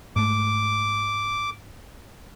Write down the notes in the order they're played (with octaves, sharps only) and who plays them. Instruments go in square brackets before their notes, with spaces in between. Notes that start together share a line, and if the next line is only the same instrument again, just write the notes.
[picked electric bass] G#2 A3 [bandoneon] D6